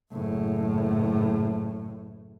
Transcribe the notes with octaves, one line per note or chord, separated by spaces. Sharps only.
F#1 A2